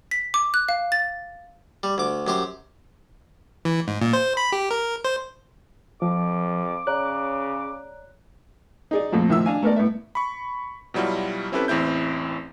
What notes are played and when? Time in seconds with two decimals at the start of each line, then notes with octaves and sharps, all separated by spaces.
0.11 B6
0.34 D6
0.54 F#6
0.69 F5
0.92 A6
1.83 G3
1.98 D2 D6
2.27 F#2 G4 C5
3.65 E3
3.88 G#2
4.01 A#2
4.13 C5
4.37 B5
4.52 G4
4.71 A#4
5.04 C5
6.02 F2 F3 D6
6.87 C#3 C#5 D5 A#5 F#6
8.91 D#4 G#4 D5
9.12 F2 A#2 F3 A3
9.29 A2 D#3 F3 E5 E6
9.46 D4 F5 G#5
9.63 A3 B3 A#4 D5
9.76 A2 B3 E5
10.15 B5 C#6
10.94 B2 F#3 G3 E4 F4
11.52 C4 C#4 E4 G4 A4 B4
11.68 A1 E2 C4 E4 G6